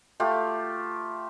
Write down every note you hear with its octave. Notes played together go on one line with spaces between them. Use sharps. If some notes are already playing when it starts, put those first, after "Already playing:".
A3 F4 G4